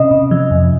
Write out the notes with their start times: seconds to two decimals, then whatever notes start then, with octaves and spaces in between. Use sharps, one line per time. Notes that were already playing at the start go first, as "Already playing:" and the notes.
Already playing: C3 C#4 D#5
0.11 C3
0.31 F3
0.51 F2